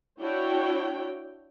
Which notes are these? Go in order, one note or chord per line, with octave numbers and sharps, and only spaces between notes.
D4 E4 F#4 C#5 G5